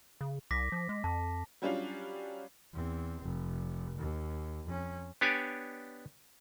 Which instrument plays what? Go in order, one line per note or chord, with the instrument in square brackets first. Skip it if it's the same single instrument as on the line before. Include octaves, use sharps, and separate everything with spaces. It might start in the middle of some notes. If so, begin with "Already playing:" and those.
[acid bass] C#3
[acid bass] C2 [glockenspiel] D6 A#6 B6
[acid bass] F3
G#3
[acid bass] F2 [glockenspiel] A5
[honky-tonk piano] F#3 G3 C#4 D4 F4
[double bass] E2 C4
F1
D#2
F2 C#4
[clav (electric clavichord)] B3 D4 G4 C#5 D5 G#5